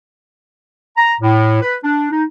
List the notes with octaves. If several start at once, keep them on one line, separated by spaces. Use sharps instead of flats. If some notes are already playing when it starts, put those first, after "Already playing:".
A#5
A2
B4
D4
D#4